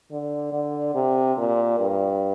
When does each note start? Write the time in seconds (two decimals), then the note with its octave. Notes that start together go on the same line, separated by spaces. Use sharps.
0.11 D3
0.53 D3
0.95 C3
1.37 A#2
1.80 G2